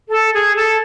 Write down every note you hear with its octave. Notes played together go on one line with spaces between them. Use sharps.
A4
G#4
A4